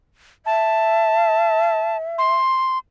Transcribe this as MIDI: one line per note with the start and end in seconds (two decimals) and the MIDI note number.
0.46 2.35 76
0.46 1.97 81
2.18 2.78 84